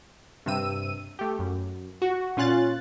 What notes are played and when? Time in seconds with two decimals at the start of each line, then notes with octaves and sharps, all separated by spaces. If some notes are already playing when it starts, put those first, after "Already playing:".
0.46 G2 C3 E6 D#7
1.19 A3 G4
1.39 F#2
2.02 F#4
2.37 A#2 C#4 F4 F#6 A6